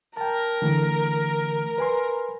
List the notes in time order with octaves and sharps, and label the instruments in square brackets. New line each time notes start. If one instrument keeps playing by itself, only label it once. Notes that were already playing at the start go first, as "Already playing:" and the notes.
[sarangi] A#4 [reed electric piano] G5 A5
[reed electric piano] D3 E3 A3
B4 G#5 C6